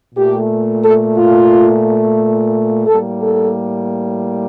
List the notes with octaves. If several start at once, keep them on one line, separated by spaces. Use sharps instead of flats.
A#2 A3 G4
A4
F4
A2 G3 A#3 A4
A4